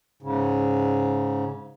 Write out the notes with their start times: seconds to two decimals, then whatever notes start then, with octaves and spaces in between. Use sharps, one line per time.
0.23 G#2 C#3